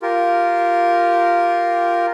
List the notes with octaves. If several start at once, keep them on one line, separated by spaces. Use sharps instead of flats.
F4 G4 A#4